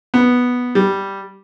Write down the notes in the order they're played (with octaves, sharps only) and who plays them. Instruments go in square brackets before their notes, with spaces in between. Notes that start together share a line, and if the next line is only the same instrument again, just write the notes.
[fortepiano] B3
G3